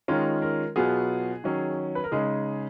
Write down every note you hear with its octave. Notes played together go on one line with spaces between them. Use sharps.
D#3 G#3 C#4 F4 A#4
A#4
B2 F#3 B3 F4 G#4
D#3 F#3 C#4
B4
A#4
C#3 G#3 D#4 G#4